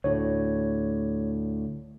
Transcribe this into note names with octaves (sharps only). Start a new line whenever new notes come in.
D2 A2 C#5